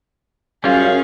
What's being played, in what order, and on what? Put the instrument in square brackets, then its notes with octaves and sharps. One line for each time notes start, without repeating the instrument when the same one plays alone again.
[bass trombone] F#2 [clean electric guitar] G3 F4 [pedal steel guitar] C#4 [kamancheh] G#4 F5